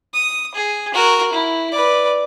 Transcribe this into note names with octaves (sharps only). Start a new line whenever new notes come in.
D#6
G#4
F#4 A#4
E4
B4 D5